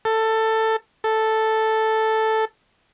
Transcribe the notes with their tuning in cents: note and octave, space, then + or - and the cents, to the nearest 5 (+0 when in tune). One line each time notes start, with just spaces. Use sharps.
A4 +15
A4 +0